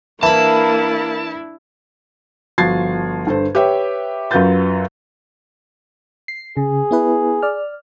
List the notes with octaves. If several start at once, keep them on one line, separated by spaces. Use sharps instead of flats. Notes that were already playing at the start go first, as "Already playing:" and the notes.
E3 A#3 D4 E4 A5 B5
G1 F3 F#4 G#6 A6 C7
G2 D3 A4 C5
G4 B4 C#5 E5 G5
F#2 F#3 F4 B4 G6 A6
C7
C#3 G#4
B3 E4 B4
D5 F6